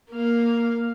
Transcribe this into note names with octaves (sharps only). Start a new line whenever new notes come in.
A#3 F5